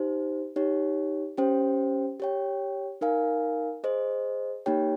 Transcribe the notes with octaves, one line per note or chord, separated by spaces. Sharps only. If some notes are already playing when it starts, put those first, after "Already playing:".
Already playing: D#4 G4 C5
D#4 G4 C#5
C#4 G4 C5 G5
G4 C#5 G5
D#4 A#4 F5 G#5
G#4 C5 D#5
A#3 D#4 G4 C#5 G5